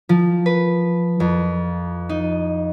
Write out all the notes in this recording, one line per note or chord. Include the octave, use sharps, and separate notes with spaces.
F3
B4
F2
D#4